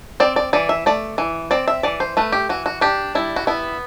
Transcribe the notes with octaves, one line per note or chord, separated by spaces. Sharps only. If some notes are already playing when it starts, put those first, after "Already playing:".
C4 D5
D5
E3 D5
E5
A3 D5
E3
C4 D5
E5
E3 D5
C5
A3 B4
G4
E3 F#4
F#4
D4 G4
G3 E4
F#4
B3 E4